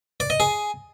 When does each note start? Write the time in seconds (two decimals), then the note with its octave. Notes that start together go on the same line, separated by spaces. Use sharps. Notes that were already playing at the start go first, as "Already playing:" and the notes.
0.20 D5
0.30 D#5
0.40 G#4